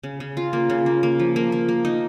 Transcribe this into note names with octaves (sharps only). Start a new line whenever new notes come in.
C#3
C#3
F4
A#3
C#3
A#3
A#3
F3
A#3
A#3
A#3
D#4